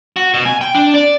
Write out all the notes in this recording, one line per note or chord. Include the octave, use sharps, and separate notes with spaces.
F#4
B2
G#5
G5
D4
D5